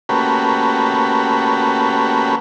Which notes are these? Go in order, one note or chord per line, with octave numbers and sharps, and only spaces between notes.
A3 A#3 C#4 F#4 G4 B4